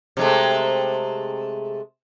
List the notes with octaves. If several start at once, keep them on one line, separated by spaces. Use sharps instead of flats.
C3 G#3 A3